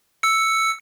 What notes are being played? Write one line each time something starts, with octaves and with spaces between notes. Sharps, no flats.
E6 C#7